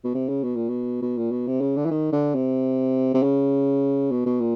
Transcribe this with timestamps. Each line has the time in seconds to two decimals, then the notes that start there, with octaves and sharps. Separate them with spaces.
0.04 B2
0.14 C3
0.29 C#3
0.43 B2
0.56 A#2
0.69 B2
1.02 B2
1.18 A#2
1.31 B2
1.47 C3
1.61 C#3
1.76 D3
1.86 E3
1.91 D#3
2.12 D3
2.35 C3
3.14 C3
3.23 C#3
4.11 B2
4.26 B2
4.40 A#2